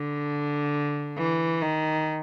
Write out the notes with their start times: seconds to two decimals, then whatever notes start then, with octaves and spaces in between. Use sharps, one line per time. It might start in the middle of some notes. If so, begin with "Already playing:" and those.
Already playing: D3
1.18 E3
1.62 D#3